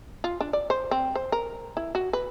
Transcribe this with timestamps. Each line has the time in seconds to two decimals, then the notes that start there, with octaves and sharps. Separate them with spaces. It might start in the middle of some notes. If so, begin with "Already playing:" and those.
0.24 F4
0.41 D4
0.53 D5
0.70 C5
0.91 C4
1.15 C5
1.32 A#4
1.77 E4
1.95 F#4
2.13 B4